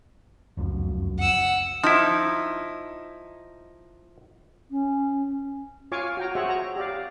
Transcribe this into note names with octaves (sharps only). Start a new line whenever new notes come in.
F1 C#2 F#2
F#5 E6
F3 D#4 E4
C#4
F4 C#5 F5 G#5 C#6 D6
F#4 G5 A#5
F#4 G#4 C5 C#5 E5 F#5
A#5
G4 D5 F5